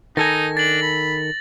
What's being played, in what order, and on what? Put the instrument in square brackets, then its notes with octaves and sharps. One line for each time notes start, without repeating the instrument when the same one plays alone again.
[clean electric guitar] D#3 A4 G#5 [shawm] D#4 [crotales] A#6
[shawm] D4 [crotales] A6 F#7
[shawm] B5